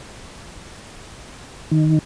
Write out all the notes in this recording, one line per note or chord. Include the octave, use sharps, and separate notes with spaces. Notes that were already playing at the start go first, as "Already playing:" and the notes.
D#3